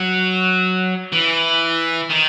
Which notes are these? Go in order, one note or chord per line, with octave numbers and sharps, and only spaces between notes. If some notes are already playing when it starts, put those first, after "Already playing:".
Already playing: F#3
E3
D#3